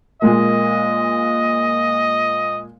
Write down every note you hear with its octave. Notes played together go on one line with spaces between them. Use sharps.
A#2 G#3 A#3 D#5